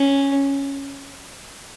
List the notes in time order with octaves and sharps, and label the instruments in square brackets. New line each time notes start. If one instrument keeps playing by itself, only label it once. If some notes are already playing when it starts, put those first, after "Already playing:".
Already playing: [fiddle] C#4